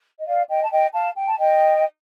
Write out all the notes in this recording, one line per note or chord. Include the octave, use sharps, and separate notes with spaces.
D#5
D5 F5
D#5 G5
A5
D#5 G5
F5 A5
G5
A5
D#5 G5